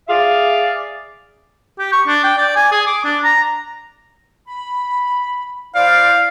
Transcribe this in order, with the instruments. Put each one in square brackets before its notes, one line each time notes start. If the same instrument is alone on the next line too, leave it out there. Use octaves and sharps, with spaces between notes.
[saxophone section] G#4 D5 E5 F5
[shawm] G4
C#6
D4
G5
D5
G#5
G#4
D6
D4
A#5
[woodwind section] B5
[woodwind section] E4 C5 D5 [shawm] F5